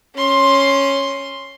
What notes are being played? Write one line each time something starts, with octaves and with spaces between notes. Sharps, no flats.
C#4 C6